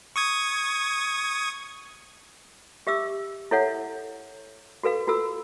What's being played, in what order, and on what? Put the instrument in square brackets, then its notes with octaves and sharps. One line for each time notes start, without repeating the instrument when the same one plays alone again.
[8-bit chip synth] C#6 D#6 G#6
[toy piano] G4 E5 D6 E6
E4 A4 C#5 E5 F#5
F#4 A4 B4 F5
F4 F#4 A4 E6